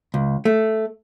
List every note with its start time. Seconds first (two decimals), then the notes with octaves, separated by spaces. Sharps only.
0.14 C#2
0.45 A3